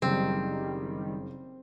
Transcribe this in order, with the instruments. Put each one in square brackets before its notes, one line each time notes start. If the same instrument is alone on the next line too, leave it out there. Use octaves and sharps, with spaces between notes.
[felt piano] F#1 [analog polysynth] D#3 G3 [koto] C4